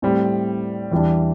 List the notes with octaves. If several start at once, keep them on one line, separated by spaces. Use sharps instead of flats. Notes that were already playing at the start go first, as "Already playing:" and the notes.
A2 G3 C4
E2 E3 G3 D4